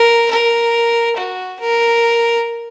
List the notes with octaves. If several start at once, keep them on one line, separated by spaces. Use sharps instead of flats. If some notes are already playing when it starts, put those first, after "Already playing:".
Already playing: A#4
A#4
F#4
A#4